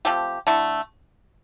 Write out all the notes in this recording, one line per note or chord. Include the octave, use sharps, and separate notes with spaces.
F3 A3 C4 G4
D3 A3 E4